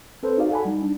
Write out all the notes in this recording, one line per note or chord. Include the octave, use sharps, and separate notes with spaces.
C4 A4 B4 C5
D#4 F#4 G#4 D5 F5
A4 D5 F#5 G#5 A5 B5
G3 D#4
D4